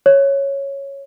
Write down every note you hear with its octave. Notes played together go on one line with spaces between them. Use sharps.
C#5